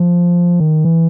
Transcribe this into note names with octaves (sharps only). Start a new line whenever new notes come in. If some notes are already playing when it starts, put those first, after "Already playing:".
Already playing: F3
D#3
E3